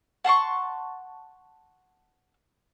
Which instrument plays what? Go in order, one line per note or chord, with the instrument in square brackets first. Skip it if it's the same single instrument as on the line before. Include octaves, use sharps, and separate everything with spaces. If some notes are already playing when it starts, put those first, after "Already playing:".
[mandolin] F#5 A5 C6 C#6